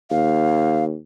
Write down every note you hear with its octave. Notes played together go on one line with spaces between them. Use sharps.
D#2 F5